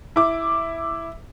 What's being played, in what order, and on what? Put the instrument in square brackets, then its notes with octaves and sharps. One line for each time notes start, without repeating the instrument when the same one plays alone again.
[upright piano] E4 D6